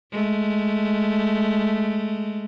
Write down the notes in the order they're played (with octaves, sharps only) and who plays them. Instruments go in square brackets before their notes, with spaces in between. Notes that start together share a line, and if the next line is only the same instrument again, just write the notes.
[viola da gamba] G#3 A3